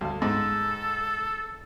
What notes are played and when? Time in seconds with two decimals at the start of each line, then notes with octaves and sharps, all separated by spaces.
0.01 D2 F5
0.22 G#2 A4